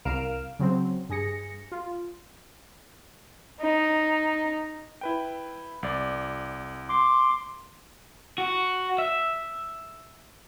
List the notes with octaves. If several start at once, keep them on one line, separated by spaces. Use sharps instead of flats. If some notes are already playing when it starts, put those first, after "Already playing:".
C2 A#4 F5 F6 D7 E7
C#3 F#3 C4
G2 G#4 A#6 C#7
F4
D#4
E4 B4 G5
C2 D5
C6 D6
F#4
E5